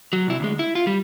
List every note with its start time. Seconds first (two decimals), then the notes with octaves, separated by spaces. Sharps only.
0.13 F#3
0.27 C2 E4
0.40 D2 G#3
0.59 E4
0.75 F4
0.87 G3